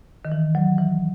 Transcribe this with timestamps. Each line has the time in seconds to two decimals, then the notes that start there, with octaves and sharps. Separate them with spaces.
0.25 D#3
0.32 E3
0.55 F#3
0.78 E3